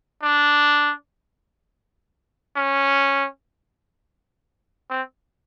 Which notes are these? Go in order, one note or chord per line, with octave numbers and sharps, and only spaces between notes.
D4
C#4
C4